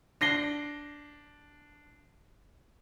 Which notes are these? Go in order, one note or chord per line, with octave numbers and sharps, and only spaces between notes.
D4 A#6 C7 G7